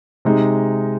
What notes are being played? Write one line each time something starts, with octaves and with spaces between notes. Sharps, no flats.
C3 G#3 D#4